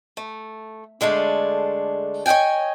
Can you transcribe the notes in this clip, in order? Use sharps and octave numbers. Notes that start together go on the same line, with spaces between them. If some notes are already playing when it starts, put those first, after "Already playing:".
A3
D3 G#3 A3 D4
C#5 D#5 F5 G5 G#5